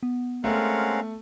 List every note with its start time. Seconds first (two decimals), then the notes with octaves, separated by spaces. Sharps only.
0.03 B3
0.44 G#3 A3 C4 C#4 A#4 F5 F#5